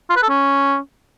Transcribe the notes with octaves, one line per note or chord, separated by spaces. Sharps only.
F4
B4
A4
C#4